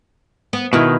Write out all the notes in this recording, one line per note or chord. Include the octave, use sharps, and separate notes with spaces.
B3
B2 D#3 E4 B4